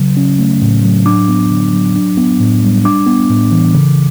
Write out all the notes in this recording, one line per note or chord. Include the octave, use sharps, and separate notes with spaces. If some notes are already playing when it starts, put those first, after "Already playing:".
Already playing: C#3 F#3
C#4
A3
A2
F#3
D4 D6
B3
D3
F#3
D4
B3
A2
G3
D4 D6
B3
A2
E3
C#3